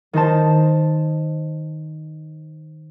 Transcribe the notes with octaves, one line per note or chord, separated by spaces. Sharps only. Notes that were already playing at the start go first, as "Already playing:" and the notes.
D#3 D#4 C5 A5